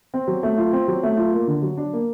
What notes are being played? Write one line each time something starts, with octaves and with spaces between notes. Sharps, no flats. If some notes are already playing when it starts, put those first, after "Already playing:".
C4
F#3
A3
F4
C4
F#3
A3
F4
A#3
D3
F#3
D4
A#3